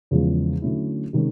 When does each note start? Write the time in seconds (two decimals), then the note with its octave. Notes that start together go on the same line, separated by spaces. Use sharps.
0.11 E2 C#3 F3 G#3
0.62 D3 F#3 A3 C#4 E4
1.13 C3 D#3 G#3 C#4